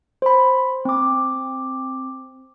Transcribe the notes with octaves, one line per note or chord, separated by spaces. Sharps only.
C5 B5
C4 D6